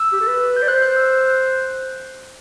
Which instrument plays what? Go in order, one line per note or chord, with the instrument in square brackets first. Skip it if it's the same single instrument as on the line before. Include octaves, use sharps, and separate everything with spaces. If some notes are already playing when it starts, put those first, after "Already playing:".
Already playing: [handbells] E6
[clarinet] G4
A4
B4
[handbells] G6
[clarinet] D5
[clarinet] C5 [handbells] F#6
[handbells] F#6
E6
F#6